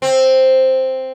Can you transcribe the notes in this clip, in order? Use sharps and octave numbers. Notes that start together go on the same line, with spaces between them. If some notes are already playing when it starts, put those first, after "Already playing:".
C4